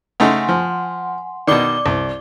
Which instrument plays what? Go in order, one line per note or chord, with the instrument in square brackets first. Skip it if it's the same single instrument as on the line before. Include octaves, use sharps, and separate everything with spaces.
[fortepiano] C#3 A3 D#4 [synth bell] F#5 G#5 C6
[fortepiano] F3
[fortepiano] B2 D#3 [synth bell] D5 D6 G7
[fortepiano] C2